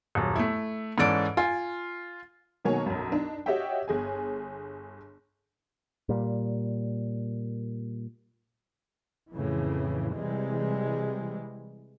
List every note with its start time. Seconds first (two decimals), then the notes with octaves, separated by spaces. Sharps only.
0.15 D#1 F#2
0.36 A3 E4
0.98 G#2 E3 C#4 A4 D5 D7
1.37 F4 G#5
2.65 B2 D#3 F#3 A#3 C#5 G#5
2.86 B1 F#2
3.12 D4 D#4
3.46 F#4 G4 C#5 D#5 E5 G5
3.88 G1 G#4 G#5
6.09 A#2 G3
9.32 F2 A2 C#3 E3
10.15 C3 E3 G3 G#3